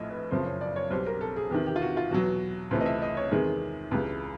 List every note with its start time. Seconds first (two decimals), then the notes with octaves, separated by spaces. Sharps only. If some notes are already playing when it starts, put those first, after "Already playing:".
Already playing: A#1 A2 F3 A3 D#5 E5
0.10 B4
0.31 F#1 F2 C#3 F3 C5
0.46 C#5
0.61 D5
0.76 C#5
0.90 B1 B2 G3 C5
1.07 A#4
1.21 A4
1.36 G#4
1.51 E2 C3 D#3 G4
1.66 G4
1.76 F4
1.82 F#4
1.97 F4
2.11 E2 B2 F#3 F#4
2.71 C#2 C3 E3 A3 C5
2.81 D#5
2.86 E5
3.02 D#5
3.17 C#5
3.31 E2 C3 D#3 G#3 G#4
3.91 C#2 C#3 E3 G#3 G4